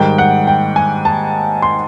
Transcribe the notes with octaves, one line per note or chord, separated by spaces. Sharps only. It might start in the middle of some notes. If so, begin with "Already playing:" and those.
Already playing: G#2 D#3 G3 G5
F#5
G5
G#5
A5
C6